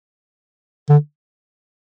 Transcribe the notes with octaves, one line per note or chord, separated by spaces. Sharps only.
D3